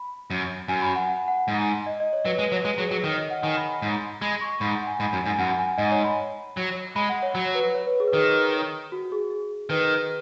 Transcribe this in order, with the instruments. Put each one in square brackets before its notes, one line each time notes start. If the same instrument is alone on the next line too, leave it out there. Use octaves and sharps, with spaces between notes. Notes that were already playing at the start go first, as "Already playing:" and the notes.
Already playing: [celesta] B5
[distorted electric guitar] F#2
[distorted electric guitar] F#2 [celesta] G#5
[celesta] B5
F#5
F#5
F#5
[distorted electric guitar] G#2
[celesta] D#5
D#5
C#5
[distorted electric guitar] F#3 [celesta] B4
[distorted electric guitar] G#3 [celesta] B4
[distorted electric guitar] F#3 [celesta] C#5
[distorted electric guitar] G#3
[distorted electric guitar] F#3 [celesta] G#4
[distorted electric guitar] F#3 [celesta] G#4
[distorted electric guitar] D#3 [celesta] C#5
[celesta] D#5
F#5
[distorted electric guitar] D#3 [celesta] G#5
[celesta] B5
B5
[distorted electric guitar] G#2
[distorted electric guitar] G#3 [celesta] B5
[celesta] C#6
[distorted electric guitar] G#2 [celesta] B5
[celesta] F#5
G#5
[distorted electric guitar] G#2 [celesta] B5
[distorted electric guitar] F#2 [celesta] B5
[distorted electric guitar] G#2 [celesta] G#5
[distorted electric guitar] F#2 [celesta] F#5
[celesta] G#5
[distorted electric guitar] G#2 [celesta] D#5
[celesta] C#5
B5
[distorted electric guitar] F#3
[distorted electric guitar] G#3 [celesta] B5
[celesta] F#5
C#5
[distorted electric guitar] F#3 [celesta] C#5
[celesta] B4
C#5
B4
G#4
B4
[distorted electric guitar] D#3 [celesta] G#4
[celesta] F#4
G#4
G#4
[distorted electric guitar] D#3 [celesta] B4